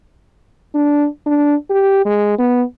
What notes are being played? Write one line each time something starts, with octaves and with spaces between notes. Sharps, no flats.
D4
D4
G4
G#3
B3